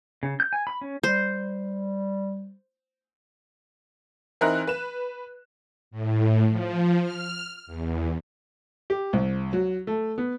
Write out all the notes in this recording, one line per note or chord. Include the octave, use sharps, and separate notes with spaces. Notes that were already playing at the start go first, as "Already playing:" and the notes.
C#3
G6
G#5
B5
C#4
G3 C5
E3 C4 D#4 A#4 F#6
B4 E7
A2
F3
F6
E2
G4
C2
F#3
A3
B3